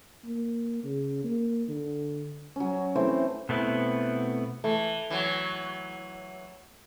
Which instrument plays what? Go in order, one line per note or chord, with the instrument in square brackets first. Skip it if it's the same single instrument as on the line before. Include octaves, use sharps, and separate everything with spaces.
[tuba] A#3
C#3
A#3
D3
[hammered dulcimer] F#3 C#4
E3 A3 C4 C5
[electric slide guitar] B2 A3 B3 C4 E4
[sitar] E3 [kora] A3
[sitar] E3 F#3